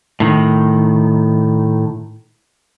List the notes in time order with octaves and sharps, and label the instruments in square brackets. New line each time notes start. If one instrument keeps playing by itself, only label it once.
[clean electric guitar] A2 D#3